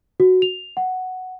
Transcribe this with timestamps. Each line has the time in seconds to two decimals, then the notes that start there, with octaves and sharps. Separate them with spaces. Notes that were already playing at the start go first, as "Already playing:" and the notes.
0.20 F#4
0.42 F7
0.77 F#5